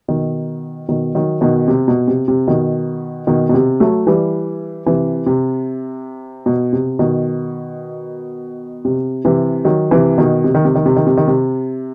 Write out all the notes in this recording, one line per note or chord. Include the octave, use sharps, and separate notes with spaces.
B2 D#3
B2 D#3
D#3 F#3
B2 D#3
C3
B2
C3
C3
B2 D#3
B2 D#3
B2
C3
F#3 A3
E3 G3
C3 E3
C3
B2
C3
B2 D#3
C3
C3 E3
D#3 F#3
C3 E3
B2 D#3
C3
D#3
C3
D#3
C3
D#3
C3
D#3
C3